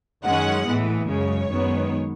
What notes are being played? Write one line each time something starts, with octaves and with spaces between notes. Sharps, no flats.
F#2 D#3 G#3 C#4 F#5
A2 E3 B3
F#2 C#3 G#3 C#5
F#2 D#3 G#3 B3